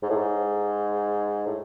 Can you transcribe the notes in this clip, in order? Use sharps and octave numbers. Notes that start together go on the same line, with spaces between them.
G#2
A2
G#2
A2